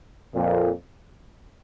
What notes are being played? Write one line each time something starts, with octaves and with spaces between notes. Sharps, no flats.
F2 A#2